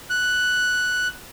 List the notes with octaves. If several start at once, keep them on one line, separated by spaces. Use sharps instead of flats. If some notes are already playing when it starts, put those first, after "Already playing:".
F#6